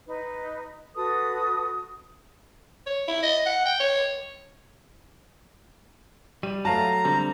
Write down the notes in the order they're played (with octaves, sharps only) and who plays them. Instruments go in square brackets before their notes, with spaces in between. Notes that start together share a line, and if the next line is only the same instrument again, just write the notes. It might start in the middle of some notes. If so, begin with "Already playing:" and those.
[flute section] D#4 B4
F#4 A4 B4 D#6
[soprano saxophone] C#5
E4
D#5
F#5
G5
C#5
[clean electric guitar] G3 [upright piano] D#7
[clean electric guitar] F#3 [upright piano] A3 F5 A5 [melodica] A#5
[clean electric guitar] D3 G3 C4